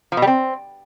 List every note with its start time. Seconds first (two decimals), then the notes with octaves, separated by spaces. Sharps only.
0.12 F3
0.17 B2
0.22 G3
0.27 C4